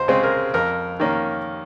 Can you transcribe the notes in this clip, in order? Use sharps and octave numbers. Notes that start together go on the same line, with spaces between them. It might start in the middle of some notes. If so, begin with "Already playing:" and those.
Already playing: C#2 C5
C#3 G#3 C4
A#4
F2 A#4
D#3 A#3 C#4